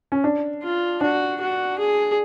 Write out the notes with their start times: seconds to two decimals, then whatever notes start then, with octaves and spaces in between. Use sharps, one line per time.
0.12 C#4
0.24 D4
0.63 F4
1.01 D4 F#4
1.41 F#4
1.79 G#4